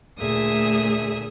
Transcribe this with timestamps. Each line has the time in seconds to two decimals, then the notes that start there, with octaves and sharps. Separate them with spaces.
0.19 D2 A#2 A3 G#4 E5 D#6